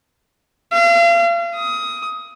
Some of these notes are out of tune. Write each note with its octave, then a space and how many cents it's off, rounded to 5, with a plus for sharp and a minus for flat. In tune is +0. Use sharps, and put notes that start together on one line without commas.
F5 -40
D#6 +20